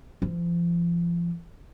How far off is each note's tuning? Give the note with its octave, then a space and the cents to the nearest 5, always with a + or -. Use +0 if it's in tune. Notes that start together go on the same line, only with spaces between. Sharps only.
F3 -35